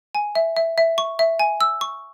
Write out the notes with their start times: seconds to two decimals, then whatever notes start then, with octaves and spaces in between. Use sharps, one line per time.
0.15 G#5
0.35 E5
0.56 E5
0.78 E5
0.98 C#6
1.19 E5
1.39 G#5
1.61 E6
1.81 C#6